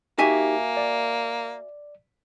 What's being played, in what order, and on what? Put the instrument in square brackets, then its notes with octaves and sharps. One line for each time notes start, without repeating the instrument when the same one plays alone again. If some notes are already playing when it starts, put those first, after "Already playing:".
[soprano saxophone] A#3 [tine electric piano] D#4 G4 [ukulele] F#4 E5 G#5
[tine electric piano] D5